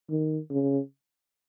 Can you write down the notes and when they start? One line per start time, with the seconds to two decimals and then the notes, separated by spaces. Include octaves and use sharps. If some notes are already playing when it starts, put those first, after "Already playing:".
0.10 D#3
0.50 C#3